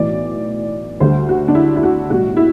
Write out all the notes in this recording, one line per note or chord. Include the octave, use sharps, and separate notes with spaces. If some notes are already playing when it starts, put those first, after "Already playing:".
Already playing: B1 A2 E3 D5
D2 D3 G3 C5
F#4
D4
E4
E4
F#4
B1 A2 G3 F#4
E4